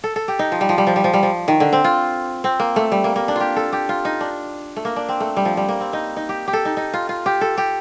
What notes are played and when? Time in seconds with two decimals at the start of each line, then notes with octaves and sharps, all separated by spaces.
0.04 A4
0.16 A4
0.28 G4
0.39 D#4
0.52 F3
0.61 G3
0.69 F3
0.78 G3
0.87 F3
0.96 G3
1.04 F3
1.14 G3
1.23 F3
1.48 D#3
1.60 D3
1.73 C4
1.84 F4
2.44 C4
2.60 A#3
2.76 A3
2.92 G3
3.04 A#3
3.16 A#3
3.28 D4
3.36 F4 G4
3.56 A4
3.72 G4
3.89 F4
4.05 D#4
4.21 D4
4.76 A3
4.85 A#3
4.96 D4
5.09 C4
5.20 A3
5.37 G3
5.45 F3
5.57 G3
5.69 A#3
5.80 C4
5.93 D#4
6.17 D#4
6.29 G4
6.48 G4
6.53 A4
6.65 D#4
6.77 D#4
6.94 F4
7.09 F4
7.26 G4
7.41 A4
7.58 G4